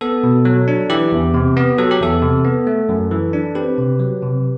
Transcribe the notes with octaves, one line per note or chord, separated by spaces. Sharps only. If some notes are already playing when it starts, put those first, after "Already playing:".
B3 A4
B2
F#3
D4
E3 G4
E2
C3
B3
F#3 A4
G4
E2 A4
C3
B3
A3
F#2
E3
D4
C4 G4 B4
C3
F#3
C3